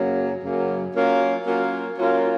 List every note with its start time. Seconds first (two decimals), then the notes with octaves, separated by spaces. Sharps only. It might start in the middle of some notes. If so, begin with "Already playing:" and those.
Already playing: F#2 C#3 F#3 A#3
0.42 F#2 C#3 F#3 A#3
0.94 F#3 A#3 C#4 F4 A#4
1.45 F#3 A#3 C#4 F4 A#4
1.97 F#3 A#3 C#4 F4 A#4